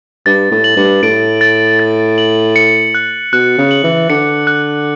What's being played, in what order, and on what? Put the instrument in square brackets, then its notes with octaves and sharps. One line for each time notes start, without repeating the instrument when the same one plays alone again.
[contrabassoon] G2 [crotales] A6
[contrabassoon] A2
[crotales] F#7
[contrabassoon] G2
[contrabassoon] A2 [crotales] D7
[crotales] A6
A6
F#7
C#7
F#6
[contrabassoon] B2 [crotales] F#6
[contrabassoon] C#3
[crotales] F#7
[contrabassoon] E3
[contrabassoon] D3 [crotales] C#7
[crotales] F#6